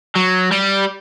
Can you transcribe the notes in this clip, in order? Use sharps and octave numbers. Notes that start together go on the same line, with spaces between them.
F#3
G3